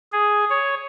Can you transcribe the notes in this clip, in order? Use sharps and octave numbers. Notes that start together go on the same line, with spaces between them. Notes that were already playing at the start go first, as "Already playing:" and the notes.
G#4
C#5